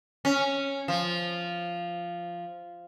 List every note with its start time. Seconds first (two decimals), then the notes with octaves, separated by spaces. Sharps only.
0.25 C#4
0.88 F3